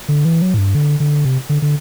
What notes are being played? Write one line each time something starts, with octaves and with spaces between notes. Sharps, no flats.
D3
E3
F#3
A2
G2
D3
D3
C3
D3
D3